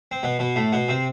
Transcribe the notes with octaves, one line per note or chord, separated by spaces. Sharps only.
C4
B2 B3
B2 B3
A2 A3
B2 B3
C3 C4